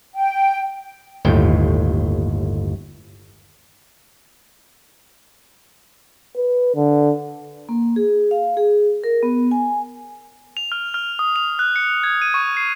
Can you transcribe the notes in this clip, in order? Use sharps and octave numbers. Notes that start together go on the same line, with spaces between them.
G5
G1 D#2 A2 G5
B4
D3
A#3
G#4
F5
G#4
A#4
B3
G#5
F7
F6
F6
D#6
F7
F#6
C#7
G#6
D#7
C#6
C7